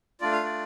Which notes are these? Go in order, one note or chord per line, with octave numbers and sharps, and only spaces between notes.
A3 D4 F4 D5
F5
D5